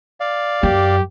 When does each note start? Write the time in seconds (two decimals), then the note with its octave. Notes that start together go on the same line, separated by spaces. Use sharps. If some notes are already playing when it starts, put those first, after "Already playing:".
0.20 D5 F5
0.63 F#2 G4